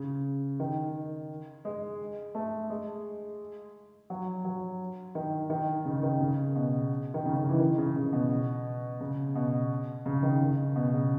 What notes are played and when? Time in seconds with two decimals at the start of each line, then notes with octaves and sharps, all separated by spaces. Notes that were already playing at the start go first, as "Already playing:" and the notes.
Already playing: C#3
0.60 D#3
1.65 G#3
2.35 A3
2.70 G#3
4.10 F#3
4.45 F#3
5.15 D#3
5.50 D#3
5.85 C#3
6.03 D#3
6.20 C#3
6.55 B2
7.14 D#3
7.25 C#3
7.36 C#3
7.49 E3
7.60 D#3
7.78 C#3
7.96 C#3
8.13 B2
9.00 C#3
9.35 B2
10.06 C#3
10.23 D#3
10.40 C#3
10.76 B2
10.93 C#3